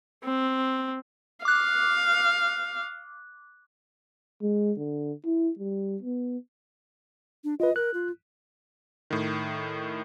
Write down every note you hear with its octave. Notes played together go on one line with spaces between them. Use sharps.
C4
F5 D6 F#6
G#3
D3
E4
G3
B3
D4
F4 B4 D#5
A#4 F#6
F4
A2 D#3